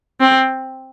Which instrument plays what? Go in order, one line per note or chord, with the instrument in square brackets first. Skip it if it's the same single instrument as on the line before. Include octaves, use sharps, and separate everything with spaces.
[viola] C4